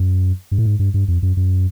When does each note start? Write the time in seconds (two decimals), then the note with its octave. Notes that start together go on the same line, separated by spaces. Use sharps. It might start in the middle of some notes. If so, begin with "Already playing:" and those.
Already playing: F#2
0.51 G2
0.58 A2
0.66 G#2
0.79 G2
0.94 G2
1.08 F2
1.23 F#2
1.37 F#2